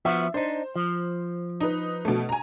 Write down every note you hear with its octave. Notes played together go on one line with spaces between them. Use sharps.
F3 B3 F#4 E5
D4 D#4 C5
F3
D#4 B4
B2 A3
G#5 A#5